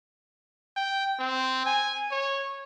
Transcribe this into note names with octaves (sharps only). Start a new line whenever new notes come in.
G5
C4
G#5
C#5